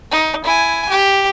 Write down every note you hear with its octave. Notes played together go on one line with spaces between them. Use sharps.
D#4
E4 G#5
G4